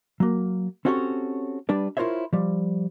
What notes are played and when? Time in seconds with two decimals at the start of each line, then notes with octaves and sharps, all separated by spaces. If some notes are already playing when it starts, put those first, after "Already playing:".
0.20 F#3 A#3
0.85 C4 C#4 F#4 G4 A4 C#5
1.69 G3 D4 B4 D5
1.97 E4 F4 A#4 C5 C#5 E5
2.33 F3 G3